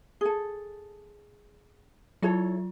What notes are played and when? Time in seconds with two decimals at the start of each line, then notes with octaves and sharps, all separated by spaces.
0.21 G#4 A4
2.22 F#3 E4 F4 A4 C#5